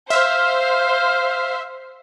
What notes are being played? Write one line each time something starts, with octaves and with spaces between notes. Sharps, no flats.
C5 E5 F5 F6